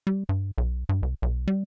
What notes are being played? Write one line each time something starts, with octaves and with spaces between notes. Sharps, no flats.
G3
G2
B1
G2
C2
B1
G3